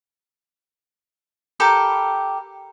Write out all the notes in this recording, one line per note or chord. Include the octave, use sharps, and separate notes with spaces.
G4 A4 A#4 B5